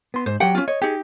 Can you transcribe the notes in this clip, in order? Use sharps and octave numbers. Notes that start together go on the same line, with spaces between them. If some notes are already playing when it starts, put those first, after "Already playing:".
B3 C6
G#2 C5
F#3 G4 F#5 G5
C#4 F4
C#5 D#5
D#4 G4 G#4